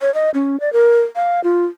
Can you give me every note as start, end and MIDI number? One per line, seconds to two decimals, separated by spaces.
0.01 0.13 73
0.14 0.30 75
0.34 0.59 61
0.60 0.72 74
0.73 1.01 70
1.16 1.43 77
1.44 1.65 65